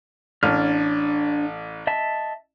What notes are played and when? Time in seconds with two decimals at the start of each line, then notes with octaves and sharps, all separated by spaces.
0.43 A1 D4 C#5 F6
1.87 D#5 E5 A5